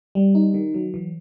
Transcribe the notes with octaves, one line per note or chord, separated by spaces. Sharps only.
G3
D#4
D#3
F#3
E3